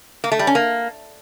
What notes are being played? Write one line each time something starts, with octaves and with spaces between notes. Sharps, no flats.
A#3
A3
G3
C#4
A#3